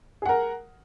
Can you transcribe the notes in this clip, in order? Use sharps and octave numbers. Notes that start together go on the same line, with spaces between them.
G#4 A#4 F#5